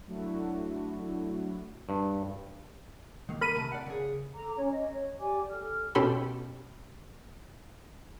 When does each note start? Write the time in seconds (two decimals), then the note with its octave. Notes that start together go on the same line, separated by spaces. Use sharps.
0.07 F#3 A3 D4 E4 F#4
1.89 G2
3.29 D#3 A#3
3.41 A#4 B5 D#7
3.56 C3 A3 A5
3.72 D5 F#5
3.86 C#3 G#4
4.34 A4 A#5 D6
4.56 C#4 C#5
4.70 D#5
4.92 C#5
5.19 G4 D5 G#5 D6
5.51 A4 F6
5.95 B2 C#4 G4 A4 B5 C6